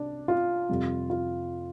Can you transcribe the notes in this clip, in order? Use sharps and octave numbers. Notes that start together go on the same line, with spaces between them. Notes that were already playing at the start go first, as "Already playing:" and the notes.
Already playing: C2 D4 D5
F4
F2 C3 G3
F4